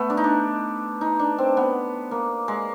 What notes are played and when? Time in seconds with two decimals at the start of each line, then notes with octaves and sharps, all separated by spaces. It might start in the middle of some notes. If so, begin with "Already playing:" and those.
Already playing: A3 B3
0.10 D4
0.17 D#4
0.24 D4
1.01 D#4
1.19 D4
1.38 C4
1.57 B3
2.11 A#3
2.48 G#3